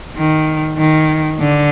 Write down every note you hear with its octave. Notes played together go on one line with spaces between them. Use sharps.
D#3
D#3
D3